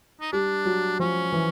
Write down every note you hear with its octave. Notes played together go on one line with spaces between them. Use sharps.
D#4
G3 D4
F#3
F3 C#4
E3